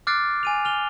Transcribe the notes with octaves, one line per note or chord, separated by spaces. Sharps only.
D6 F6 F#6 A6 C7 D7
G#5 D#7 F7
F6 F7 G7